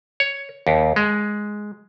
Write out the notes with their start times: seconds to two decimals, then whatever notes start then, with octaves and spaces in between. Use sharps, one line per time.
0.20 C#5
0.67 D#2
0.96 G#3